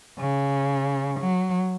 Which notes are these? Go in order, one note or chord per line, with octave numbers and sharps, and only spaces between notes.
C#3
F#3